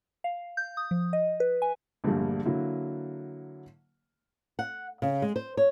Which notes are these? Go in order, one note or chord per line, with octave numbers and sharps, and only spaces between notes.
F5
G6
D#6
F3
D#5
B4
G#5
A#1 G2 D3 G3 A3 A#3
D3 F#3 A#3 E4
F#5
C#3
G#3
C5
C#5